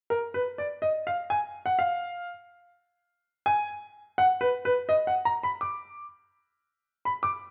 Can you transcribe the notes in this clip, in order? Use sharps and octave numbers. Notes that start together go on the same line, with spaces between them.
A#4
B4
D5
D#5
F5
G#5
F#5
F5
G#5
F#5
B4
B4
D#5
F#5
A#5
B5
D6
B5
D6